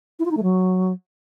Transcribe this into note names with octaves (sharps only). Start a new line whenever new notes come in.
E4
F4
D#4
A3
F#3